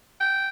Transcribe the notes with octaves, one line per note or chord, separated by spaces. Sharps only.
G5